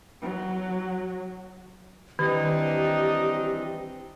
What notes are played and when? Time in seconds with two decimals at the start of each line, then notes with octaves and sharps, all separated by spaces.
0.22 F#3
2.19 D#3 E3 G3 C4 D4 D#4 G4